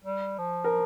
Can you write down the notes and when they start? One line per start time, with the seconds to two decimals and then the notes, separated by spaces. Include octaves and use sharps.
0.05 G3
0.38 F3
0.64 A#4